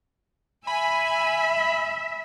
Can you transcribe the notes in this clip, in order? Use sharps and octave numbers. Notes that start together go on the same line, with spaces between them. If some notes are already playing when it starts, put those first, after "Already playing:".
E5 G#5 B5